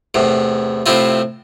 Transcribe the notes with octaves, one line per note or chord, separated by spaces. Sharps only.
E2 A2 C3
A2 C3 C4 E4 F4